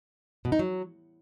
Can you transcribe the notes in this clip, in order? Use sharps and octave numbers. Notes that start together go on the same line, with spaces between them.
B2
D#4
F#3